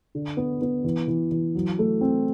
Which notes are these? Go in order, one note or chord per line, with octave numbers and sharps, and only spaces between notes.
D3
B3
B3
E3
E3
E3
F#3
A3
C4